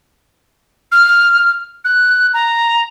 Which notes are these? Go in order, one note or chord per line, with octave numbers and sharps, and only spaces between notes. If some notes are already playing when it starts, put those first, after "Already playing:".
F6
F#6
A#5